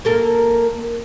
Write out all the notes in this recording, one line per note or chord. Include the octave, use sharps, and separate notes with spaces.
A#3 A4 A#4